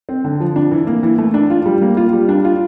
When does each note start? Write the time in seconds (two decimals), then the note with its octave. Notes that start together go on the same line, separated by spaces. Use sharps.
0.09 C4
0.24 D3
0.40 F3
0.56 D4
0.71 E3
0.87 A#3
1.03 E3
1.18 A3
1.34 D4
1.50 F4
1.66 G3
1.82 A#3
1.97 F4
2.13 G3
2.29 D4
2.45 F4